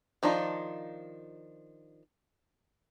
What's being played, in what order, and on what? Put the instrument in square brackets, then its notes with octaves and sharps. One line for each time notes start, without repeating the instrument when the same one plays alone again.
[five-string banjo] D#3 F3 D4 D#4 F4